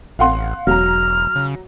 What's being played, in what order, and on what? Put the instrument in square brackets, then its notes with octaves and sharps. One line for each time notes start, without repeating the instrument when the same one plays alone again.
[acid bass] A1 [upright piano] F5 F#5 C6
[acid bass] E1 [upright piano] F#3 A#5 [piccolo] F6
[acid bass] C#3